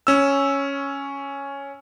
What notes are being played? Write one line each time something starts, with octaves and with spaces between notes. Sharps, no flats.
C#4 E6